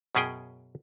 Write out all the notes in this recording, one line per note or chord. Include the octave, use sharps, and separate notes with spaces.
F#2 B2 C#4 G#4 G5